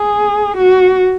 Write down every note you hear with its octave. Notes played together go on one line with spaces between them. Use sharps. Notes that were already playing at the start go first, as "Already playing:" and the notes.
Already playing: G#4
F#4